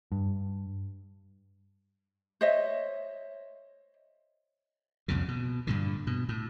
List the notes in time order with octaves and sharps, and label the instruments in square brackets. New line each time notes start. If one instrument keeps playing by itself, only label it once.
[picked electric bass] G2
[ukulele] C5 C#5 D#5 E5
[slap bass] C2 F2 A#2 C#3
B2
G2 A#2 D3
B2
A2